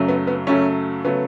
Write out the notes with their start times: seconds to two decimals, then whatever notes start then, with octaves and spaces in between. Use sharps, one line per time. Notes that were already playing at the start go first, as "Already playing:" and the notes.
Already playing: F#2 C#3 F#3 A3
0.08 B3
0.27 B3
0.47 F#2 C#3 F#3 A3 C#4
1.04 C#3 F#3 A3 B3